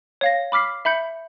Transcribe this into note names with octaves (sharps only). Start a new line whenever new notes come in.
C#5 F5 A#6
B5 D6 F6 B6 C7
E5 B5 G6 C#7